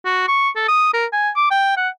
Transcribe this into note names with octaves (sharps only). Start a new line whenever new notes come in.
F#4
C#6
A4
D#6
A#4
G#5
D6
G5
F#5